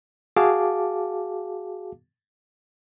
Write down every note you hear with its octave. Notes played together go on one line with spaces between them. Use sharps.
F#4 G#4 F5 A5 D6